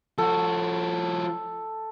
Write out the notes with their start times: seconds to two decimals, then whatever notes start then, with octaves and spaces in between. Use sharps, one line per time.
0.18 F3 F#4 A4